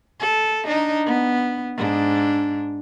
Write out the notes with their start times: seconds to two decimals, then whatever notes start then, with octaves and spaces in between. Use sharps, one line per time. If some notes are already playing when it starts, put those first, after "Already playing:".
0.20 A4
0.65 D4 D#4
1.06 B3
1.77 G#2 D4